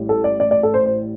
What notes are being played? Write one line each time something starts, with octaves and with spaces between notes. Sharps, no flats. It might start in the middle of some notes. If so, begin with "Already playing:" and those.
Already playing: A1 A2 G3
A4
D5
D5
D5
A4
C5
C5